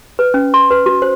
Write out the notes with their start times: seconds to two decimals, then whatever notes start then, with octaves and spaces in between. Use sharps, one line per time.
0.19 B4
0.34 C#4
0.54 C6
0.71 B4
0.86 F#4
1.02 C5